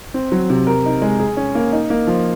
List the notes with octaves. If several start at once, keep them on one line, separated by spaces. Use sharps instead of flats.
C4
F#3
C3
A#4
D#4
G#3
G#4
C#4
A#3
D#4
A#3
F3